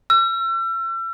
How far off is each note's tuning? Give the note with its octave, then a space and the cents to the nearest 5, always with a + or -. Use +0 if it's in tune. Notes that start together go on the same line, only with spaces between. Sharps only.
E6 +40